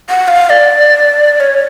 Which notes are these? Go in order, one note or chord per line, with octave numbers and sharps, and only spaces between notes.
F#5
F5
F5
D5
C#5